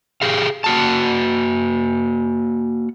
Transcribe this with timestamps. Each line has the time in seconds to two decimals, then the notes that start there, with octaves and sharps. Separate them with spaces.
0.22 G4 G#4 F5
0.64 A#3 F#4 A5